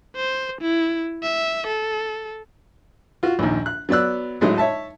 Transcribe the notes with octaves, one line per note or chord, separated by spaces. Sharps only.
C5
E4
E5
A4
F4 F#4
A#1 D#2
F#6
F#3 B3 D5 E6 F#6
G#1 A2 F#3 G#3 D#4 D#5
C#5 E5 A5